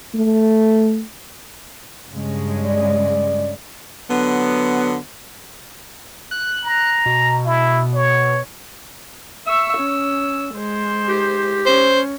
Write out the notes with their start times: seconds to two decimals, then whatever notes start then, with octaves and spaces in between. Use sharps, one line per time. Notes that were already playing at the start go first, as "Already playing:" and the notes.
0.14 A3
2.10 G2 C#3 G#3
2.66 D5
4.10 D3 F#3 B3
6.31 F#6
6.64 A#5
7.06 B2
7.46 E4
7.95 C#5
9.47 E5 C#6 E6
9.78 C#4
10.56 G#3 C5
11.08 G4
11.66 C#4 C5